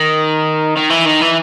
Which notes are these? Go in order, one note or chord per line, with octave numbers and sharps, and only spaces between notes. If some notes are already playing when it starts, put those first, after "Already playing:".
Already playing: D#3
D#3
E3
D#3
E3